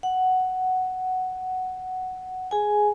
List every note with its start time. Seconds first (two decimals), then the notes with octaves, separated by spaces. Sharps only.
0.03 F#5
2.51 G#4 G#5